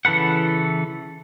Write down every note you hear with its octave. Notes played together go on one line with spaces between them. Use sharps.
C#3 E3 A4 B4 F#5